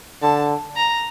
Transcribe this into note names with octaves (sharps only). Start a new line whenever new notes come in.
D3 A5
A#5